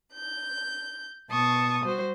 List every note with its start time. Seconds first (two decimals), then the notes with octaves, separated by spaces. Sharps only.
0.13 G6
1.30 B2 A5 C#6 D#6
1.84 G3 F#4 C5